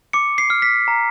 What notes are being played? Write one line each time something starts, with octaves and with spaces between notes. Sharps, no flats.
D6 C#7
C7
F6
B6
A#5